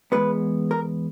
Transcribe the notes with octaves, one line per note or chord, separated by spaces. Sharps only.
E2 B2 G#3 B3 B4
A#4